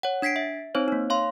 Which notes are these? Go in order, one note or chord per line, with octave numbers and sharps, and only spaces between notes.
C#5 F#5
D4 G#6 B6 C7 D7
E5
C4 D#4 C5 C#5
A#3 D#4
C#5 F5 C6